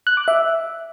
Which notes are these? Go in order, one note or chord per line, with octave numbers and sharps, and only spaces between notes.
F#6
D6
E5